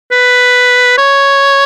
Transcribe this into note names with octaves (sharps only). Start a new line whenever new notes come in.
B4
C#5